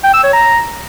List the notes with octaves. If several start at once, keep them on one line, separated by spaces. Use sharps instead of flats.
G5
E6
C#5
A#5